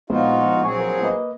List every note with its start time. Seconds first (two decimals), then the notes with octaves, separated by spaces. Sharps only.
0.10 A#1 G#3 B3 D#4 F4 F#4 C5
0.63 F#3 C4 G#4 G#5 C#6
0.80 A#4
1.02 A#3 B4 D#5